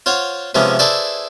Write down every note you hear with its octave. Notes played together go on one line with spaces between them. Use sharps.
F4 C5 C#5 F#5
C3 E3 F3 G#3 B3 C#4
E4 G#4 A4 B4 C5 D5